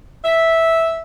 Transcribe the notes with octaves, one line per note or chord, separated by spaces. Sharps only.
E5